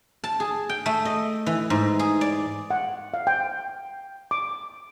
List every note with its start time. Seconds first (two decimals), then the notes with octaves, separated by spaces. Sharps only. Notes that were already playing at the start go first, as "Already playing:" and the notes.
0.24 A5
0.40 G#4
0.69 G5
0.86 A3
1.05 D#5
1.46 E3
1.70 G#2
1.99 G#4
2.21 D5
2.71 F#5
3.14 F5
3.27 G5
4.31 D6